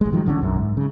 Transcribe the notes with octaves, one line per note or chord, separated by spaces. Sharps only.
A1 G#3
D#3 F3 F#3
A1 D3 D#3 C#4
B1 F#2
G#2
C#3